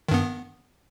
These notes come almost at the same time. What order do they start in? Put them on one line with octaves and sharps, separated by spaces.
D#3 G2 B3